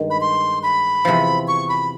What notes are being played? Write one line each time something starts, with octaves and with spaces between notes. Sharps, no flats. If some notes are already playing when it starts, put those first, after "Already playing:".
Already playing: G2 D#3 G#3
B5
C6
B5
E2 C3 F3
C#6
B5